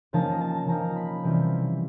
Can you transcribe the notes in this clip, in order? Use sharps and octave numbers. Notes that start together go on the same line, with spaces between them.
C#3 F3 A#3 D#4 A5
A#5
A5
C#3 F3 A#3 D#4 A#5
B5
C3 E3 G3 C4 F4